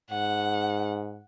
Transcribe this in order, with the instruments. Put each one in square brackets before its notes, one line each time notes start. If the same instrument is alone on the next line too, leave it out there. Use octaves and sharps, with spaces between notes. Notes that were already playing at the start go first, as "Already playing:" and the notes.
[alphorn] G#2 [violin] F#5